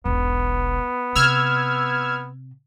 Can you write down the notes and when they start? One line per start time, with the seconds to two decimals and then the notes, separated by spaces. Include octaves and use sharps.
0.05 E1 B1 B3
1.16 C3 E6 F6 G#6